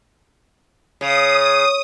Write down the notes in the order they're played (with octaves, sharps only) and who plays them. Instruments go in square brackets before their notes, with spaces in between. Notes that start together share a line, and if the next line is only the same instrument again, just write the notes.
[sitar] C#3 [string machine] D#6